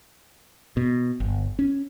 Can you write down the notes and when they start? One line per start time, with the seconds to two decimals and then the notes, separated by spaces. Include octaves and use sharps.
0.77 B2
1.20 G1
1.59 C#4